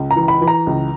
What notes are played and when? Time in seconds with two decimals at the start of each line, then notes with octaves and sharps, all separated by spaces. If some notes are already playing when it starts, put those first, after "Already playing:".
Already playing: C#2
0.11 A#5
0.16 E3
0.28 B5
0.42 E3
0.48 A#5
0.67 C#2